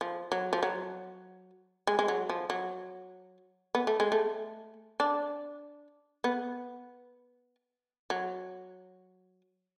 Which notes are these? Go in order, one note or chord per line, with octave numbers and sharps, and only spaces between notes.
F3
F#3
F3
F#3
G#3
G#3
F#3
F3
F#3
B3
A3
G#3
A3
D4
B3
F#3